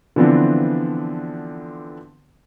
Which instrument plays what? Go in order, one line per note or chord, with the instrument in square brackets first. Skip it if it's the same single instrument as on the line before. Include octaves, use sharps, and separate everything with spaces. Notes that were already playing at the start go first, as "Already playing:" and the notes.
[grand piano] D3 E3 F3 B3 C4 D4